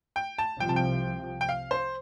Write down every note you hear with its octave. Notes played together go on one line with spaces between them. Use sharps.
G5
A5
C2 C3 F3 G5
A5
G5
G5
F5
C5